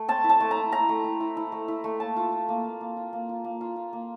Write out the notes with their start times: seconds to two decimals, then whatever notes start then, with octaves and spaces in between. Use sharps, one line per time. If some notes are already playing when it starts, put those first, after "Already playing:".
Already playing: A3
0.08 C4 A5
0.24 E4
0.29 A5
0.40 A3
0.51 A#5
0.57 E4
0.72 E4 A#5
0.89 A3
1.04 E4
1.20 E4
1.37 E4
1.52 A3
1.68 E4
1.84 A3
2.00 A#3 A5
2.16 F4
2.32 F4
2.49 A#3
2.64 A#3
2.81 A#3
2.97 F4
3.13 A#3
3.29 F4
3.44 A#3
3.61 F4
3.76 F4
3.93 A#3